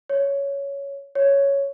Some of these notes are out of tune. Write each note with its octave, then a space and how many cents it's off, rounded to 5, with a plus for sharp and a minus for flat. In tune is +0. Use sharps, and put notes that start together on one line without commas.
C#5 +10
C#5 +5